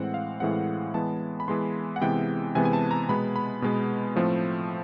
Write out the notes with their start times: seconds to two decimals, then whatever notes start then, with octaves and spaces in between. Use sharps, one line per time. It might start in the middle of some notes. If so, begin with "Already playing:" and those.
Already playing: A2 E3 G#3 C4 F#5
0.14 F5
0.40 A2 E3 G#3 C4 F#5
0.94 E3 G#3 B3 A5
1.40 B5
1.48 E3 G#3 B3 C6
1.96 F#5
2.01 C3 E3 G#3 B3 G5
2.55 C3 E3 G#3 B3 G#5
2.65 G#5
2.73 A5
2.91 A#5
3.09 B2 G#3 B3 B5
3.36 B5
3.62 B2 G#3 B3
4.16 A2 F3 A3 C4